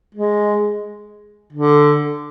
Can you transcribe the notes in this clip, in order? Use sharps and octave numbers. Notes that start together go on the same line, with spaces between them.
G#3
D3